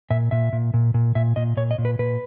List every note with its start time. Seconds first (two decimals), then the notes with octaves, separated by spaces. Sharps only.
0.10 A#2 E5
0.31 A#2 E5
0.53 A#2
0.74 A#2
0.94 A#2
1.15 A#2 E5
1.36 A#2 D#5
1.57 A#2 C#5
1.71 D#5
1.78 A#2
1.85 B4
1.99 A#2 B4